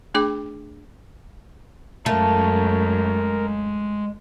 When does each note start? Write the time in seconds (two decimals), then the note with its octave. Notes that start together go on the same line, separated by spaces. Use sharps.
0.14 A3 D4 G#4 G5 D6
2.06 F#2 G#3 A3 A#4 F5